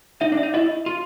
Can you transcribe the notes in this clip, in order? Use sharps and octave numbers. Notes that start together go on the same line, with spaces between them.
D#4 E5
D4
E5
D#4
E4 D#5
F4